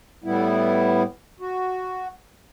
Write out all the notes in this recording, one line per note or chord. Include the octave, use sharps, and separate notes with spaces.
A2 G3 B3 E4
F#4